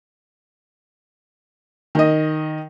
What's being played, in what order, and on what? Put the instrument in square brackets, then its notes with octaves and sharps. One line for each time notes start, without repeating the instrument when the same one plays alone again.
[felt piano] D#3 D#5